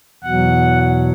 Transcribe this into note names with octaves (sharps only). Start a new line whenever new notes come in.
E2 B2 F#3 F#5